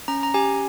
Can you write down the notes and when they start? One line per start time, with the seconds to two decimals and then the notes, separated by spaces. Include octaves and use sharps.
0.08 C#4 A#5
0.23 A#5
0.34 G4 G#5